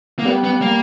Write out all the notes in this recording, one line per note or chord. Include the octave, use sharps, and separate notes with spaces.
A#3
G3 B3
B3
A#3